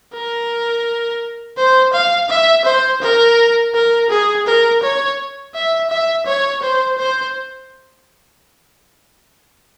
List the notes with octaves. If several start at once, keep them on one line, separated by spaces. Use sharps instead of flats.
A#4
C5
F5
E5
C5
A#4
A#4
G#4
A#4
C#5
E5
E5
C#5
C5
C5